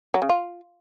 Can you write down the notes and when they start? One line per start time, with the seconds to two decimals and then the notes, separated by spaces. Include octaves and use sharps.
0.14 F#3
0.22 C#3
0.29 F4